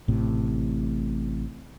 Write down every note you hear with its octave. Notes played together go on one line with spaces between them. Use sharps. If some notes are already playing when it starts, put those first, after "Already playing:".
A1 A2 C3